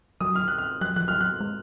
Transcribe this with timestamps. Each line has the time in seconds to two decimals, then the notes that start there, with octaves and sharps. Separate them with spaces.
0.21 F#3 D#6
0.35 F6
0.48 F#6
0.58 F6
0.81 F#3 F#6
0.96 F3 F#6
1.08 F#3 F6
1.21 F#6
1.41 G#3